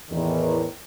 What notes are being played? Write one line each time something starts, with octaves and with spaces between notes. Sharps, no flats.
E2 A2 D#3 E3